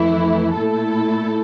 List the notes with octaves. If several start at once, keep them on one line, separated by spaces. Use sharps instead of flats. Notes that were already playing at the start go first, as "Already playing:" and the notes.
Already playing: F2 E3 A3 E4
A#2 A3 E4 A4